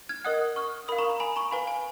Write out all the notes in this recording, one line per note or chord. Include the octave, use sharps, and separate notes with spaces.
F6 G#6
A#4 D#5 F#5 D#6 F#6
C#6 F6
A#4 F5 B5 D#6
A#5 C#6
A#5
G#5 B5
A#5 C#6
B4 F5 G#5 B5
G#5